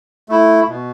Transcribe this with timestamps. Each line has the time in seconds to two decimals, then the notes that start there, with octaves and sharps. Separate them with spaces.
0.29 A3 E4
0.68 B2